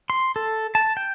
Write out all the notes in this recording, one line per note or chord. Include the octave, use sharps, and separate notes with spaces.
C6
A4
A5
G5